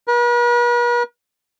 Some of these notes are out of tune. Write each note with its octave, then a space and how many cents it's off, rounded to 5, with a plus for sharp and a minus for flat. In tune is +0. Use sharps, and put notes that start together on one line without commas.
B4 -45